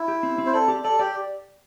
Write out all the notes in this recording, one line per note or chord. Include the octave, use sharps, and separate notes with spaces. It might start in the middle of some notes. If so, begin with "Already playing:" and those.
Already playing: E4
G4
C4
C4
C5
A4 D5
G4
A4 D5
G4 D5